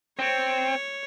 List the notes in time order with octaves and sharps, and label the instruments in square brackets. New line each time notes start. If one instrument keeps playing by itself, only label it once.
[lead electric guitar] C4 [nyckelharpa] C#5